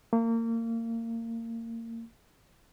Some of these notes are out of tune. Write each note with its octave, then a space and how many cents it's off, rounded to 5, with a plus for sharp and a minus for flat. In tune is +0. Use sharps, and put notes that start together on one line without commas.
A#3 -30